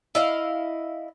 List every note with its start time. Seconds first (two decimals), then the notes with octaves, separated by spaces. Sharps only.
0.15 E4 D#5 F5